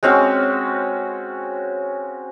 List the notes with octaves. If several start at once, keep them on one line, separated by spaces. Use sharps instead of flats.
G#3 C4 C#4 F#4